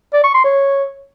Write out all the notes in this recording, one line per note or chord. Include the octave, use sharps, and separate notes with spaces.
D5
C#6
C6
C#5